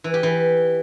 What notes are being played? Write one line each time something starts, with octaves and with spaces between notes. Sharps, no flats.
E3
G4
E3